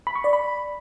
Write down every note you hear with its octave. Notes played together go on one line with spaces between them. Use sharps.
B5
C#6
D5
B5